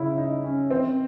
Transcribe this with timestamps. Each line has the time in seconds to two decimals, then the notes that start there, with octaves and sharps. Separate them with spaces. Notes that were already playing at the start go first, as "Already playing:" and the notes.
Already playing: C#3 E4
0.18 D#4
0.44 C#4
0.71 E3 C4
0.88 D#3